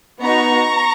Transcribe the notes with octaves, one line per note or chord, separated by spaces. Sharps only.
B3 D#4 F#4 A#5 C#6